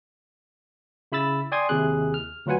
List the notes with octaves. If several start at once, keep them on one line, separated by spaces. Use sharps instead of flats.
C#3 E4 B5 E6 A6
D5 G5 G#5 C6 D#6 G#6
D#2 C3 E4 G#4 F#6
F6
D2 F#3 F4 B4 F#5 G#5